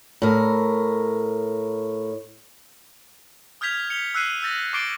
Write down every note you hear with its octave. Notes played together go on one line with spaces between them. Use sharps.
A2 A#4
D#6 F6 G6 G#6 B6 F7
C#7 F7 G7
E6 F#6 C7 D#7
E6 G6 A6 A#6
C#6 D6 A6 C7 D7 G7